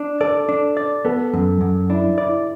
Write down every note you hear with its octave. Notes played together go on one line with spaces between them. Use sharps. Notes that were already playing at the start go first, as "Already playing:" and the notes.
Already playing: D4
A4 D5
D4
D5
B3 A4
F#2
F#2
D4 E4
E4 D5